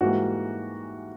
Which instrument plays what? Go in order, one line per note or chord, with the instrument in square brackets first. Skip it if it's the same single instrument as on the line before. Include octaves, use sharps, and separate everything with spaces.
[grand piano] G#2 E3 G3 A#3 F#4